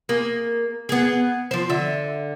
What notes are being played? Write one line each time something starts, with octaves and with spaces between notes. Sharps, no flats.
A#3 G#4
B3 G#4
F3 C5
D3 E5